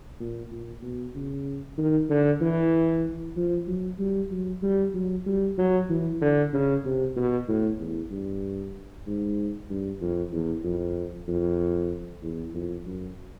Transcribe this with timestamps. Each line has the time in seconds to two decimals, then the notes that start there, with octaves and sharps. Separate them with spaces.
0.20 A#2
0.51 A#2
0.83 B2
1.15 C#3
1.78 D#3
2.10 D3
2.41 E3
3.37 F3
3.68 F#3
3.99 G3
4.31 F#3
4.63 G3
4.94 F#3
5.26 G3
5.58 F#3
5.90 E3
6.21 D3
6.53 C#3
6.85 C3
7.16 B2
7.48 A2
7.79 E2
8.11 G2
9.07 G#2
9.70 G2
10.01 F2
10.33 E2
10.64 F2
11.28 F2
12.22 E2
12.54 F2
12.86 F#2